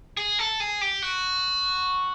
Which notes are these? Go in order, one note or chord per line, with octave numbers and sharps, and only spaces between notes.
G#4
A4
G#4
G4
F#4